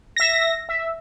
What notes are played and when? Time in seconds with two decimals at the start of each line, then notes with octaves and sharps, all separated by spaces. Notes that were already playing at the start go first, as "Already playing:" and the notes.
0.17 E5 A#6
0.69 E5